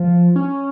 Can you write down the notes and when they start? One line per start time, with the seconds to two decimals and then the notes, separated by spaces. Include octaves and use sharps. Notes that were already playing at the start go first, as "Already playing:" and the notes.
Already playing: F3
0.36 C#4